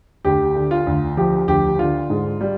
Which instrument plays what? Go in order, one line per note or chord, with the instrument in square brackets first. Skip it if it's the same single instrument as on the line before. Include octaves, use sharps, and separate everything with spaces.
[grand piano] D2 G4
D3
F4
D2
F3 G4
D2 G4
D3 F4
G#2
G3